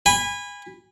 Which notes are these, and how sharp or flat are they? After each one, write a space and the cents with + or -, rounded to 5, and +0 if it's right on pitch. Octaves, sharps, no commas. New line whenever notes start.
G#5 -25 B5 +0